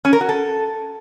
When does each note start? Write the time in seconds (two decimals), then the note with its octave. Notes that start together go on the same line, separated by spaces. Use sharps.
0.05 C#4
0.13 A#4
0.21 F#4
0.29 A4